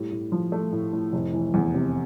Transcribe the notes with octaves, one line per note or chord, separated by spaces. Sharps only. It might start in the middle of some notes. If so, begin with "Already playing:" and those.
Already playing: A2 G3
A2
F3
A3
A2
A2
F1
E3
E2
C3